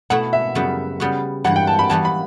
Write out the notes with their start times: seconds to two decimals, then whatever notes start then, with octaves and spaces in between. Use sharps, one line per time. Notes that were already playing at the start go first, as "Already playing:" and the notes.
0.10 B2 A3 E4 F#5
0.33 E5
0.55 F#2 C#3 G3 B3 F#4
1.00 C#3 G3 B3 F#4
1.44 G2 E3 G3 F#5
1.56 G5
1.67 A5
1.79 B5
1.89 E3 G3 B3 F#4 A5
2.05 B5